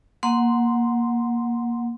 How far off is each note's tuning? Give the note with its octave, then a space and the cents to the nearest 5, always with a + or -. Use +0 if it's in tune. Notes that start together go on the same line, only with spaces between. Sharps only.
A#3 +10 F#5 -10 C6 -10